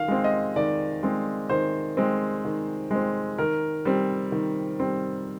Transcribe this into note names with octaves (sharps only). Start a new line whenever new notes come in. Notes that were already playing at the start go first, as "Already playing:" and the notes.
Already playing: D#3 F5
G#3 C4
D#5
D#3 D5
G#3 C4
D#3 C5
G#3 C4
D#3
G#3 C4
D#3 A#4
G3 C4
D#3
G3 C4